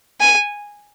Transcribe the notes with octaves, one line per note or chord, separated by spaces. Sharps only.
G#5